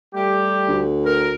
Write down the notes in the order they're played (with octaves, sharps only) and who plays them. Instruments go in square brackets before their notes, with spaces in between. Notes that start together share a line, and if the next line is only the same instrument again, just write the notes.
[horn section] G3 A3 G4
[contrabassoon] D2
[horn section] A#4